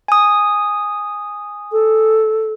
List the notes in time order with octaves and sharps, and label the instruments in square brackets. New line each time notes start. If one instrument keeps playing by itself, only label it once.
[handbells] G#5 D#6
[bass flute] A4